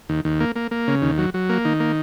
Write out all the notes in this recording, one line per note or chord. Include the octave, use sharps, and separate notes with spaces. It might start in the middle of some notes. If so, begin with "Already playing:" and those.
D#2
D#2
A#3
A#3
A#3
C#3
D#2
F#3
F#3
A#3
D#3
A#3